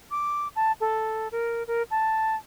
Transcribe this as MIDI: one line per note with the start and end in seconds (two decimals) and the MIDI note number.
0.11 0.48 86
0.56 0.72 81
0.80 1.28 69
1.32 1.63 70
1.67 1.83 70
1.91 2.36 81